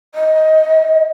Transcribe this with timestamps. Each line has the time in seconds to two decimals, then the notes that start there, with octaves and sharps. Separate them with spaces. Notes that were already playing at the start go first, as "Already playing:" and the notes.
0.15 D#5